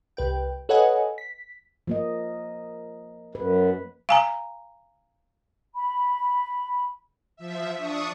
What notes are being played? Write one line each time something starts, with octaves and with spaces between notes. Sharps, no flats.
C2 B4 G5
A4 B4 C#5 D#5 F#5 G#5
B6
F3 A#3 D#5
F#2 B4
F5 G#5 A#5
B5
F3 E5
D4 C#6 D#6